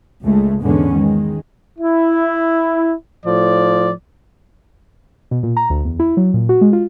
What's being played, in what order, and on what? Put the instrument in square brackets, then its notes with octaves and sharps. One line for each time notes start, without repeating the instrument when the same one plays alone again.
[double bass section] C#2 G#3 A3
E2 G#2 D3 G#3 B3 C#4
D#3 G#3
[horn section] E4
A2 F3 D5
[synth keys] B2
A#2
A#5
D2
E2
E4
F#3
A#2
F#4
G#3
F4